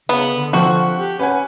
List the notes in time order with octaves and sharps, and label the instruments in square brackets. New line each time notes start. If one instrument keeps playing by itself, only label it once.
[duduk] C#3 [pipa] B3
[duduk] D3
[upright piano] F3 C4 [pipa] F#4
[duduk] G4
[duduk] C#4 [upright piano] B4 F#5 G#5